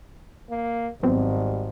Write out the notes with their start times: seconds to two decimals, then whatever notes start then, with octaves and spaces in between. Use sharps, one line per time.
0.50 A#3
1.03 G#1 F#3 G3 B3 C4